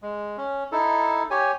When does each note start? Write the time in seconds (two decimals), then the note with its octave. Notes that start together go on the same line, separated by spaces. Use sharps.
0.02 G#3
0.38 C#4
0.72 D#4 E4 A4
1.31 G4 C#5 G#5